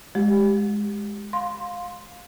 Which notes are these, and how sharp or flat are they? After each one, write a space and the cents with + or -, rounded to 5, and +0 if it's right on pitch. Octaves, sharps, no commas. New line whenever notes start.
G#3 +0 G4 +0
F5 +25 C6 +0